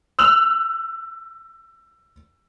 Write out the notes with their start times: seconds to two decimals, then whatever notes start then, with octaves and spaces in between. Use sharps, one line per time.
0.19 E6 F#6 F7 F#7